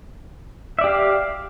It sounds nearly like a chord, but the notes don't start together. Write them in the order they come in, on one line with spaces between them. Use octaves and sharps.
E5 D5 G4 F5